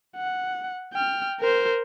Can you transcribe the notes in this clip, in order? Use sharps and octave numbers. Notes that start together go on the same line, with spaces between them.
F#5
G5 F6
A#4 C5